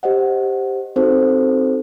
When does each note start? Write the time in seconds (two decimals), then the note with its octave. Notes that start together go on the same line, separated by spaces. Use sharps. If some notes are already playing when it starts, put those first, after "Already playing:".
0.03 G4 C5 D#5 F#5
0.96 C4 D#4 F#4 A4 C5